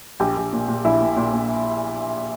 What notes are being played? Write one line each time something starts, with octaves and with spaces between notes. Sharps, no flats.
A#1 G4 G5
A#1
A#2
A#2
A#1 E4 E5
A#2
A#2
A#2